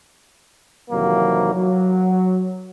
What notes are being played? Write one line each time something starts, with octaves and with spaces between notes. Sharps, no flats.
F2 C3 D#3 E3 F#3 A#3
F#3